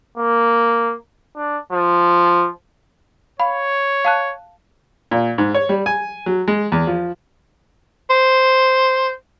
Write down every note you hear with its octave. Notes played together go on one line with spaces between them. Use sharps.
A#3
D4
F3
C#5 F5 B5
F5 A5 F#6
A#2
G#2
C#5
G3
G#5
F#3
G#3
E2
F3
C5